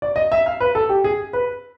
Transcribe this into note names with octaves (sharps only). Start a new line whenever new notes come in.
D5
D#5
E5
F5
B4
A4
G4
G#4
B4